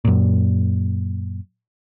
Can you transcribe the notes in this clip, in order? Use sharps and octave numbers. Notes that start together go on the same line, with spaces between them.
F#2 A#2